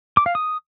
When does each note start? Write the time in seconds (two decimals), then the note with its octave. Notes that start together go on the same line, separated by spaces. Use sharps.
0.17 D6
0.26 F5
0.35 D#6